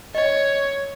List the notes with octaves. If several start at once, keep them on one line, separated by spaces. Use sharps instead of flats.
C#5 D#5